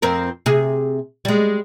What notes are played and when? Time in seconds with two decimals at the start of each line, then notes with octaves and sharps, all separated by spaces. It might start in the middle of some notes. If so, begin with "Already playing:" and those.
0.02 F2 C4 A#4
0.46 C3 G#4
1.25 G3 G#3